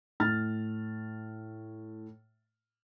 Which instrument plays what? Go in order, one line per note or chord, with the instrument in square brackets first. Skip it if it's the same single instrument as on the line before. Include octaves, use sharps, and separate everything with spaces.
[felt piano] A2 F6 A6